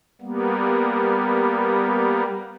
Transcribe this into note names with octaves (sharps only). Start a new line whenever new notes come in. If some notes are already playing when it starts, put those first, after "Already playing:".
G3 A#3 B3